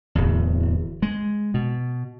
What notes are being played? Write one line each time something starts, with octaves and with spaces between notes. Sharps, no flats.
D1 E2
G#3
B2